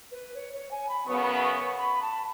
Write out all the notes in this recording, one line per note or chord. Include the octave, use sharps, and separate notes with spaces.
B4
C#5
C#5
G#5
B5
F#2 C#3 F#3 B3 C#6
B5
A5